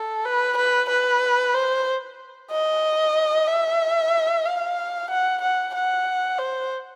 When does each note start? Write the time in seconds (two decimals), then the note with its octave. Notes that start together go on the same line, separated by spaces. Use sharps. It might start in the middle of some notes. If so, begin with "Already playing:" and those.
Already playing: A4
0.25 B4
0.57 B4
0.89 B4
1.54 C5
2.51 D#5
3.47 E5
4.45 F5
5.10 F#5
5.41 F#5
5.75 F#5
6.38 C5